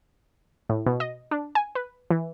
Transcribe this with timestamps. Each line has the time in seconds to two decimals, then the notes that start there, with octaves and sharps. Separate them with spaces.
0.69 A2
0.86 B2
1.00 D#5
1.31 D4
1.55 G#5
1.75 B4
2.10 E3